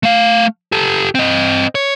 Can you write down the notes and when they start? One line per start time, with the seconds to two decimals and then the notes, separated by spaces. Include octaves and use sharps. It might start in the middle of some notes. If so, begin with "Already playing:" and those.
0.03 A3 F5
0.72 G4 A4
1.15 C4 D#5
1.75 C#5